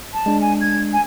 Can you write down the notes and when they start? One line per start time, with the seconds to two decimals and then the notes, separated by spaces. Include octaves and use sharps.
0.14 A5
0.26 G#3 D4
0.41 G#5
0.61 G#6
0.93 G#5